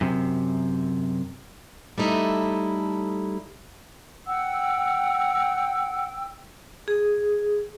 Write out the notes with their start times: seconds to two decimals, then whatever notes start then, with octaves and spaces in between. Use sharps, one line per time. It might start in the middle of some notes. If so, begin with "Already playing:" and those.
0.01 F#2 C3
1.98 G3 A3 D#4 E4 A4
4.27 F#5 G5 E6
6.88 G#4